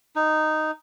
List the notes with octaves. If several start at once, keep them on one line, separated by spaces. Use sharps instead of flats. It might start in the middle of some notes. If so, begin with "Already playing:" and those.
D#4